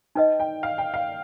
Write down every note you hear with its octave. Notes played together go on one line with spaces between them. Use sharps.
D#4 B4 D#5 G5
G5
F5
G5
F5